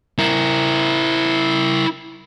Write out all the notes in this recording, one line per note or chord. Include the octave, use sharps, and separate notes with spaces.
E4 A#4